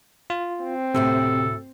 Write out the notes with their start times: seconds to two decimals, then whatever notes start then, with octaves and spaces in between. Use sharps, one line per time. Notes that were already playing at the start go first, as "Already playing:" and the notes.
0.30 F4
0.63 C4
0.94 D2 A2 C3 F#4 A4